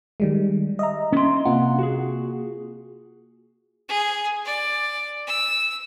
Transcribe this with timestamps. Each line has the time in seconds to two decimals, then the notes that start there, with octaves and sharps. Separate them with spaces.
0.20 D#3 G3 G#3
0.79 D#5 E5 A#5
1.12 C#4 C6
1.45 C3 A#3 F4 F#5
1.79 F#4 G#4
3.89 G#4
4.46 D5
5.27 E6